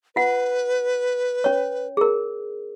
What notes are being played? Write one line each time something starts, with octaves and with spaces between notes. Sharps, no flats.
F4 B4 F#5
C#4 C#5
G#4 A#4